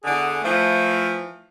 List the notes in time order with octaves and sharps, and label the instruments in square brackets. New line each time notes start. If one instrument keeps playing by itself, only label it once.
[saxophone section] E2 D3 [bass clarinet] G#4
[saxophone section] E3 F3 [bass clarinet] A3